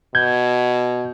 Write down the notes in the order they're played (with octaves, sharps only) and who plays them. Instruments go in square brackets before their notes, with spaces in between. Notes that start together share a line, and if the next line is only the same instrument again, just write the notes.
[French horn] B2 [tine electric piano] G6 G#6